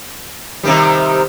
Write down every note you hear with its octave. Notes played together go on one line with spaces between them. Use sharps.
C3 D#3 G3